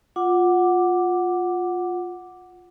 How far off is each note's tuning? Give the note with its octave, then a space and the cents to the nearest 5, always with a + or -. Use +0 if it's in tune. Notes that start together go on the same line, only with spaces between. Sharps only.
F4 +15 F#5 +0 D6 +0